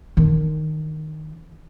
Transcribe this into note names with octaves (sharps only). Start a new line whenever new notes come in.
D#3 D4